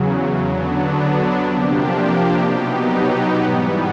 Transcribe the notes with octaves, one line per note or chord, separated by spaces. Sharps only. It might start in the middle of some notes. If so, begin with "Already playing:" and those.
Already playing: E2 C#3 F#3
D3 F#3 B3 D4
C3 F3 A#3 D4 G4
B2 F#3 B3 D#4 G4
G#2 E3 G3 B3